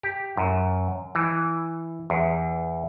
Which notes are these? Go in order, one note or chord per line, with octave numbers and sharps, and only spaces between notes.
G4
F#2
E3
E2